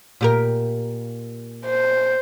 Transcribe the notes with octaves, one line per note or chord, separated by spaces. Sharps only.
A#2 G4 A#4
C5